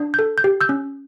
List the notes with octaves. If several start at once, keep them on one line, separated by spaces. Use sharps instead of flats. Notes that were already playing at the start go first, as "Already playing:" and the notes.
Already playing: D4
A4 G6
G6
G4
E6 G6
C#4